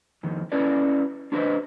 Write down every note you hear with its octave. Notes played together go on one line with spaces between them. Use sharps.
F2 D#3
C#4 E4 F#4 A4 B4 D5
D4 F#4 B4 C5 D5 D#5